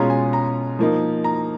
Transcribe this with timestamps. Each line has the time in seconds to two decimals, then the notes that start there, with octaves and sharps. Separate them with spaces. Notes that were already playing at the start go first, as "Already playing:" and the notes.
Already playing: B2 G#3 C#4 F4 A#5
0.10 G#5
0.33 A#5
0.79 F3 A#3 D#4
1.24 A#5